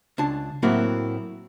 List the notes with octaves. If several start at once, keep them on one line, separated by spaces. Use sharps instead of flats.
C#2 D4 A5
A2 F#3 A#3 C4 E4 F#4